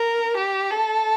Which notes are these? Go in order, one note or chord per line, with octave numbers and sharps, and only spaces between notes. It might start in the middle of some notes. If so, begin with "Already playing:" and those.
Already playing: A#4
G4
A4